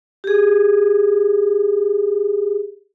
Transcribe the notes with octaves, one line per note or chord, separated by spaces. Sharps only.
G4 G#4